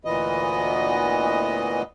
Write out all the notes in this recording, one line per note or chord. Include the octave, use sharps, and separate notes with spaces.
D2 A#2 E3 B3 D#5